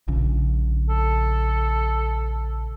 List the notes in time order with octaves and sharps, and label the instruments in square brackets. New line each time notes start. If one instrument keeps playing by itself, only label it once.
[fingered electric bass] A#1 C#3
[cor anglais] A4